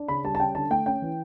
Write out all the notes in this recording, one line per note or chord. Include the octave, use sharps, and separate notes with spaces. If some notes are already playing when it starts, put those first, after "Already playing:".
Already playing: D4
C#3 B5
G3 A5
A5
C#4 G5
D3 A5
A3 G5
C#4 G5
E3